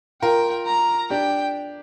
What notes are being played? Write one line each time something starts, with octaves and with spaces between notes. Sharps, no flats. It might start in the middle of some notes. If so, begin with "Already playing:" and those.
F4 A#4 G5
A#5
D4 G4 G5